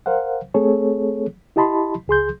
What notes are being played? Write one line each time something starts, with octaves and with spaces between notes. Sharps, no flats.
A#4 C5 F5 F#5
A3 C4 G#4 A4 C#5
E4 G4 D#5 A5 B5 C6
C#2 G#4 C6 G6